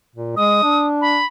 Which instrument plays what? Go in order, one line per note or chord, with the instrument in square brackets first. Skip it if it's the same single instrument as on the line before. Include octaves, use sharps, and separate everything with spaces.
[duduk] A#2
[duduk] G#3 [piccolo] D#6
[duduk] D4
[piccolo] B5